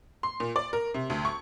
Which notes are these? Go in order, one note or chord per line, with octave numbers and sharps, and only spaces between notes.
C6
A#2
D5
A#4
C3
D2
C#6